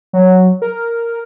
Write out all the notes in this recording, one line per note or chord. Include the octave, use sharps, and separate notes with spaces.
F#3
A#4